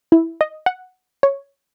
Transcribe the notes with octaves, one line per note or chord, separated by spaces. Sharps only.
E4
D#5
F#5
C#5